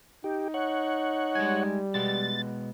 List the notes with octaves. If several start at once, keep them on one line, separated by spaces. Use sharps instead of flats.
D#4 G4
C#5 F#5
G3 G#3 G#5
B2 G#3 B3 A6